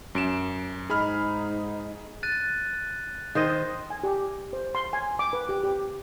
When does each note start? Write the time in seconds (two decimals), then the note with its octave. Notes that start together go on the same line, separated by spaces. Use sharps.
0.15 F#2 D7 E7
0.90 G#2 D#4 G#4 B5 F6
2.23 F#6 A6 D#7
3.35 D#3 C5 D#5
3.90 G#5
4.04 G4
4.53 C5
4.75 C6
4.93 G#5
5.19 D6
5.33 B4
5.49 G4
5.63 G4